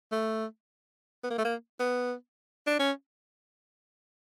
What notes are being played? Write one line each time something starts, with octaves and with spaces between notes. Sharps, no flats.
A3
B3
A#3
A3
A#3
B3
D4
C#4